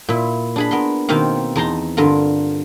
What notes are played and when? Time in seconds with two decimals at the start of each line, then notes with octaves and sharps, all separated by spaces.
0.09 A#2 E4
0.56 D4 G#4 B5
0.71 B3 A#4 C6
1.09 B2 D#3 A#3 C4 F5
1.56 E2 D#4 A5 A#5 C6
1.97 G2 D3 F4 A#4